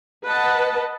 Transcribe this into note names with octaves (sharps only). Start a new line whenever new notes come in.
B4 D#5 F#5 A5